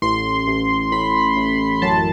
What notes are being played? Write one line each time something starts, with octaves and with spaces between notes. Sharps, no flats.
A1 C6
A1
A1 B5
A1
F#2 A5